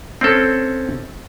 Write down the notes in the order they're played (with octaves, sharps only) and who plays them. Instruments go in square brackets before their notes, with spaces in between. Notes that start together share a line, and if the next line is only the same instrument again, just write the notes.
[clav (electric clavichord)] C4 C#4 A4